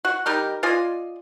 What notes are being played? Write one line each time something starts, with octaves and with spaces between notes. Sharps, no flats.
F#4
G3 D#4 G4 A#4
F4 D5 D#5 G#5